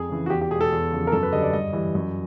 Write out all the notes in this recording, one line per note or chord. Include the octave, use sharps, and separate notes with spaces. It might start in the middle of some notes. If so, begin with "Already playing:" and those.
Already playing: F2 G#4
C#3 E3
F#4
E2 G4
G4
B2 G#3 G#4
A4
E2
C#3 F3
A#4
F#2 A4
B4
D3 G3 D#5
D5
G2 D#5
E3 G3
F#2